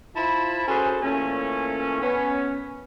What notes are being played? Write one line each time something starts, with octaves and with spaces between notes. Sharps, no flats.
E4 F4 C5 A5 B5
C#4 F#4 G#4 A4 B4 C5
A#2 E3 A3 C#4
B3 C#4